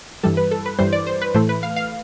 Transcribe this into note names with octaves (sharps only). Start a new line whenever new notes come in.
G2 E3 G3 A4
B4
A4
B4
G2 E3 G3 C5
D5
C5
B4
A2 E3 A3 C5
B4
F5
F5